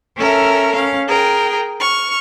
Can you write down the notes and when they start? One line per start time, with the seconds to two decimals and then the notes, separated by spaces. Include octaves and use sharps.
0.18 C#4 A4 A#4 E5
0.74 C#4 F5
1.08 G#4 A#4 G5
1.79 C#6 F6